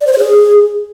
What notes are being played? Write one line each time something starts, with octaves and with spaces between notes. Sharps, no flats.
D5
C5
C#5
G#4